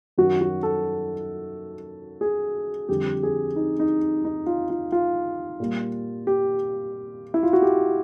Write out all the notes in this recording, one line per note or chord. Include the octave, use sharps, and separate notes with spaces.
F#2 D#3 F#3 F#4
F#4
A4
G#4
F2 D3 G3 G4
G#4
D#4
D#4
D#4
F4
F4
F4
A#2 G3
G4
E4
F4
F#4
G4